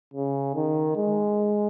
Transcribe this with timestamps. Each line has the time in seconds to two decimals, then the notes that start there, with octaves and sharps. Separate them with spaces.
0.14 C#3
0.55 D#3
0.96 G#3